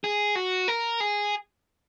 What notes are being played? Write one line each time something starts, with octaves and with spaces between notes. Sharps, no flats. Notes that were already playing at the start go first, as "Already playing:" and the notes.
G#4
F#4
A#4
G#4